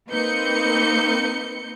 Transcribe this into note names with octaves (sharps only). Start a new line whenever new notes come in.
A#3 C4 D#4 B4 G6 C#7